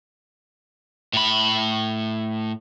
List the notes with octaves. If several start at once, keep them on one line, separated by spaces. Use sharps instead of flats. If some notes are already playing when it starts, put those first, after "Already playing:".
A2 B5